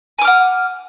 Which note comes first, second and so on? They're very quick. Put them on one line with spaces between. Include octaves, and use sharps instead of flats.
G#5 D6 F6 F#5